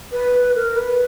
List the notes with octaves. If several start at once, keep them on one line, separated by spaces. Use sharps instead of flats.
B4
A#4
B4